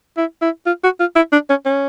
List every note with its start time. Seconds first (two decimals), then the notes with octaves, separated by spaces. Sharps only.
0.17 E4
0.42 E4
0.66 F4
0.84 F#4
1.00 F4
1.16 E4
1.32 D4
1.50 C#4
1.66 C#4